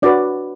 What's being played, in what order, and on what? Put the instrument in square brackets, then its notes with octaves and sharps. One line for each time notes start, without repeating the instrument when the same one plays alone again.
[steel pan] D4 F#4 B4 D5